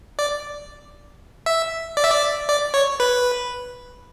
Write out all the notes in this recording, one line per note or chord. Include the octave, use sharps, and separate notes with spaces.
D5
E5
D5
E5
D5
D5
C#5
B4